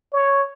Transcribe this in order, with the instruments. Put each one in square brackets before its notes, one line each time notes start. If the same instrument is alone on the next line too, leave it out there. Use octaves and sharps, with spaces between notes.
[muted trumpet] C#5